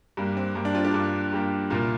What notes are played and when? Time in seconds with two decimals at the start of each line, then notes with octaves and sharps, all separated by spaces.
0.17 G2 G3 A#3
0.37 C4
0.55 G2 G3 A#3
0.65 D4
0.75 C4 F4
0.84 D4 G4
0.94 G2 G3 A#3
1.32 G2 G3 A#3
1.70 C2 A#2 A#3 F4 A#4